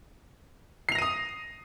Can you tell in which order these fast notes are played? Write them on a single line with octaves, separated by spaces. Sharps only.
C7 F7 A#6 D#7 D#6